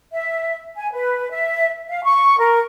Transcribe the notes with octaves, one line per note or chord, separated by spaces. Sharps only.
E5
G#5
B4
E5
F5
C#6
A#4